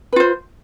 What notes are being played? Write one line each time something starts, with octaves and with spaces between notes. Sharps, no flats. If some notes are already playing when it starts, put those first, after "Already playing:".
F4 B4 C5